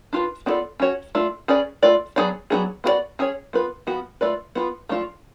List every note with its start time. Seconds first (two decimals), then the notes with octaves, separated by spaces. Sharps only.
0.13 D4 F4 B4
0.46 B3 D4 F4 A4 D5
0.80 C#4 F#4 C#5
1.15 A3 D4 F4
1.48 C#4 G#4 B4 D5
1.82 A3 F4 B4 D5
2.16 F#3 B3 D4 G#4 D5
2.50 F#3 B3 D4 G#4
2.84 B3 F#4 A4 D5
3.19 C#4 G#4 C#5
3.53 B3 F4 B4
3.87 F3 B3 F#4
4.21 A3 F4 B4 D5
4.55 B3 F4 B4
4.89 F3 A3 D4 F4